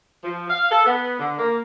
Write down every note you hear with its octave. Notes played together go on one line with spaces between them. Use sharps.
F3
F5
A4
B3
D3
A#3